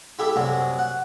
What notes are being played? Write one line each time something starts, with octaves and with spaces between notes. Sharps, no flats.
E4 G4 A4 E5
C2 F#2 F#5
F#5